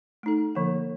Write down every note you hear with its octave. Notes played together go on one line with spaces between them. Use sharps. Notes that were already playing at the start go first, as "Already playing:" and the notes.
A3 D#4 A4
D3 F3 A#3